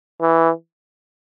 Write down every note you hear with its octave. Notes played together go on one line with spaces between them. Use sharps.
E3